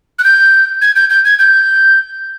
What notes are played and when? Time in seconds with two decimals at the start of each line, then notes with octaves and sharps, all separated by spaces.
0.19 F#6
0.24 G6
0.82 G#6
0.96 G6
1.10 G6
1.25 G#6
1.39 G6